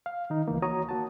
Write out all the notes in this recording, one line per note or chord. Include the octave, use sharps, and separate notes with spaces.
F5
D#3 D#4
C#2 E3 A#3
F#4 C#5 A#5 D#6
A#3 F#4 A5